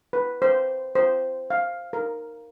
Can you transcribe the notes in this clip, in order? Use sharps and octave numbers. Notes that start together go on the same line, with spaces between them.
B4
C5
C5
F5
A#4